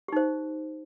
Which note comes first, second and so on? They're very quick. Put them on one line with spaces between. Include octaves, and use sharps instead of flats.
G4 D#4 C5